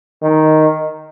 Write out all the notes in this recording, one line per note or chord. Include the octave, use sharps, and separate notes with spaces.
D#3